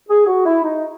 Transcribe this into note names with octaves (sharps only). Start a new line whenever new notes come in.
G#4
F#4
E4
D#4